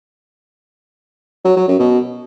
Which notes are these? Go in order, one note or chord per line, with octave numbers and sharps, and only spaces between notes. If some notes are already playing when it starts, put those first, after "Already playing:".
F#3
F#3
F#2
B2